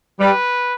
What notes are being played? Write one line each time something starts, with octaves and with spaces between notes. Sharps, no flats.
G3 B4